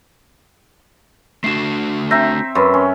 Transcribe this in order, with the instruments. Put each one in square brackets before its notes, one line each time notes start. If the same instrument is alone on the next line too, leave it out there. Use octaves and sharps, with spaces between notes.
[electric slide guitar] A3 D4 F#4 [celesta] C7 E7
[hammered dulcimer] C4 E5 [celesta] A#5 G6 A#6
[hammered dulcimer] F#2 [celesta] B4 B5 C6
[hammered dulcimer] C#4